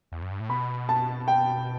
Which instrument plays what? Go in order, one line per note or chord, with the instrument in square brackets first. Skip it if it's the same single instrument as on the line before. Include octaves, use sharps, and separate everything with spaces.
[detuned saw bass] E2
F#2
G2
A2
[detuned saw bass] B2 [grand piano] B5
[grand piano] A5
G5